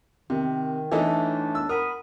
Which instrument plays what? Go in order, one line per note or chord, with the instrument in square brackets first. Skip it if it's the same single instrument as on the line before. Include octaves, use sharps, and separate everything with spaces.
[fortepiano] C3 [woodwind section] D#3
[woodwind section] A2 A3 D4 [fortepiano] E3 D#4 A4
[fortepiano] E6
[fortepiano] A#4 [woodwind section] F#5 B5 D#6